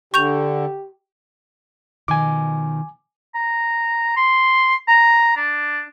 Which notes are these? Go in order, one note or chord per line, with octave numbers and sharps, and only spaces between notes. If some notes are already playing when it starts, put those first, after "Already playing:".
D3 G4 C#6 G6 F7
B2 D#3 F3 G#5 D6
A#5
C6
A#5
D4